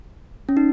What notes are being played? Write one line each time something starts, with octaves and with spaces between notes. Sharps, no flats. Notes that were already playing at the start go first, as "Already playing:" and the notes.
C#4
D#4